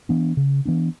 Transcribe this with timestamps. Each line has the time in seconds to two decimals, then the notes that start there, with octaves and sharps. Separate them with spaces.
0.09 E3 B3 D4
0.37 C#3
0.65 E3 B3 D4